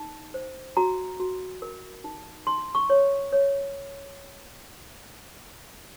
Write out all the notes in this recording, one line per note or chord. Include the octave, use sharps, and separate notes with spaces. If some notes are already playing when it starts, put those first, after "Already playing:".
Already playing: D#4
C5
F#4 A#5
F#4
A#4
D#4
D#4 C6
C#6
C#5
C#5